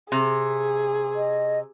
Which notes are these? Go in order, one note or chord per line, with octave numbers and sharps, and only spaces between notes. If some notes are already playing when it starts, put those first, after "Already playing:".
C3 G#4
D#5